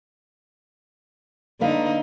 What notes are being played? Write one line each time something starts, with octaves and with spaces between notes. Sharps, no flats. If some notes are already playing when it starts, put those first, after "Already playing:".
D3 A#3 D#4 B4 F5